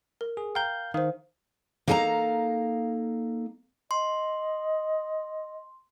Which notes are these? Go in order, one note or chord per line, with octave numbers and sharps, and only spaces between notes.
A#4
G#4
F5 G5 A#5 G6
D#3 C5 F5
A#3 D#4 A4 F5 G#5 A#5
D#5 C6